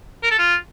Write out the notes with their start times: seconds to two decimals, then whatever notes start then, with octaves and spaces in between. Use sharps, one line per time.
0.23 A#4
0.31 A4
0.38 F4